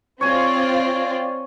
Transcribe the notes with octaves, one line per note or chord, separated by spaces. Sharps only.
C4 F4 C#5 D5 G#5